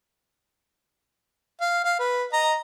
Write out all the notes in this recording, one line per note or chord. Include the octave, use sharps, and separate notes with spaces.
F5
F5
B4
D#5 A#5